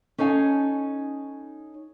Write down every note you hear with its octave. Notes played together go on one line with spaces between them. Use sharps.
C#4 D#4 A4 F5 G#5